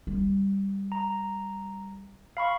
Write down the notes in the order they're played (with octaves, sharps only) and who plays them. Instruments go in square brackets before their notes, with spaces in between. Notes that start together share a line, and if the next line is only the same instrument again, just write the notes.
[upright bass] G3
[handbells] A#5
F5 B5 C#6